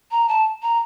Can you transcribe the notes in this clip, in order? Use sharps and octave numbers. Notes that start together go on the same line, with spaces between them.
A#5
A5
A#5